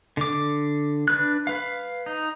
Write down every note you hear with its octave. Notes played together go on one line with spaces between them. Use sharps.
D3 D6
D4 B4 F#6
B4 F5
D#4